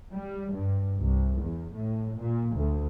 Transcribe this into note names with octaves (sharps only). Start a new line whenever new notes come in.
G3
G2
C2
E2
A2
A#2
D2